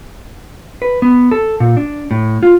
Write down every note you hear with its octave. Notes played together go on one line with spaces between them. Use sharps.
B4
B3
A4
A#2
D4
A2
F4